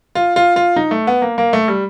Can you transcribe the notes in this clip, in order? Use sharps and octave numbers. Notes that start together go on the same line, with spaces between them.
F4
F4
F4
D#4
A3
B3
A#3
A#3
A3
G3